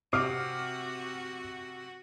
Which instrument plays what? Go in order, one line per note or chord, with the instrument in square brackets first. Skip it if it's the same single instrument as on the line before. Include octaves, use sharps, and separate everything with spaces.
[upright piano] C3 [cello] F#4 [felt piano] D6 F6 C7